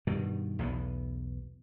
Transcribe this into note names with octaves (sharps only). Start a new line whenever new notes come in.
G2 B2 D#3
B1 E2 A2 B3